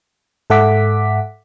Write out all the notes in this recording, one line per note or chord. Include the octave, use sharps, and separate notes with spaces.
G#2 A4 E5 F#5 D6 B6